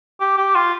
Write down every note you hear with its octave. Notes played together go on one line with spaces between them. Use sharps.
G4
G4
F4